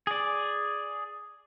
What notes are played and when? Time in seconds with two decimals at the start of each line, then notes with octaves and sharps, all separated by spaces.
0.07 G#4 D5